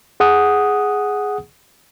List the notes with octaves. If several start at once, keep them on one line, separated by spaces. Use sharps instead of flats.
G#4 F#5 D#6